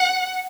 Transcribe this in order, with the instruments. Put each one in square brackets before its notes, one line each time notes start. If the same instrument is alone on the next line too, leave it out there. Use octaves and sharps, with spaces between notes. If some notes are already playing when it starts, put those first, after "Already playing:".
Already playing: [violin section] F#5